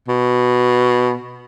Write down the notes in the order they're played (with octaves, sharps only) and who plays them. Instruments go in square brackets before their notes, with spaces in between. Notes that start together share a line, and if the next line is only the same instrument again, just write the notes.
[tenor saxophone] B2